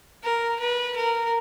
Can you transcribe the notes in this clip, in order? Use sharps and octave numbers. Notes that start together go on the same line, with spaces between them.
A#4
B4
A#4